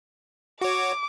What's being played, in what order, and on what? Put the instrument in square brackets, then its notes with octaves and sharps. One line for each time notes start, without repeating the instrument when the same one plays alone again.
[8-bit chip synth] F#4 C#5 [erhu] D6